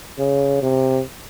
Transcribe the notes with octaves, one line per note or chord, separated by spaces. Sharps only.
C#3
C3